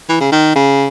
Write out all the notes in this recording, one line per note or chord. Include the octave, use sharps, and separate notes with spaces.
E3
C#3
D#3
C#3